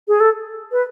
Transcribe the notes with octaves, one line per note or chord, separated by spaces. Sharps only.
G#4
A4
B4